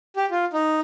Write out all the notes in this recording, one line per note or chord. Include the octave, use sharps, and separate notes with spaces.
G4
F4
D#4